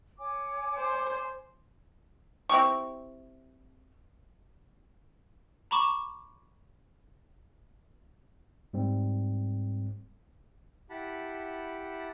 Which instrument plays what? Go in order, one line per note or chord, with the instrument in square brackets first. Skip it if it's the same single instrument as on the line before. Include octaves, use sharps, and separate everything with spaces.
[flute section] C#5 G#5 D6
[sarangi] C5
[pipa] C4 E4 G4 C#6
[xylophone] A#5 B5 C#6 D6 E7
[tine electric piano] G#2 G3 C4
[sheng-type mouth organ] E4 G4 F#5 A5 B5